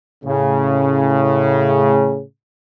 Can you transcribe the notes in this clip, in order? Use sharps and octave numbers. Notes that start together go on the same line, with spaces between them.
A2 C#3